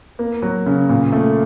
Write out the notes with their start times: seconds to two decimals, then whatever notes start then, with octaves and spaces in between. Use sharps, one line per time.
0.19 A#3
0.42 F#3
0.66 C#3
0.89 A#2
1.12 A3